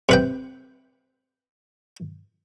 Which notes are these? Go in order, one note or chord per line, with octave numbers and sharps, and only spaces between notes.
C3 B4 G5